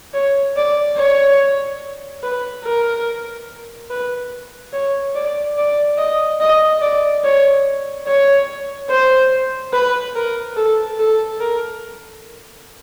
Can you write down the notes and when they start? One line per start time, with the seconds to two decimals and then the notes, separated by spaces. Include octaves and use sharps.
0.14 C#5
0.57 D5
0.97 C#5
2.23 B4
2.65 A#4
3.90 B4
4.73 C#5
5.15 D5
5.57 D5
5.98 D#5
6.41 D#5
6.81 D5
7.24 C#5
8.07 C#5
8.90 C5
9.73 B4
10.15 A#4
10.56 A4
10.99 A4
11.40 A#4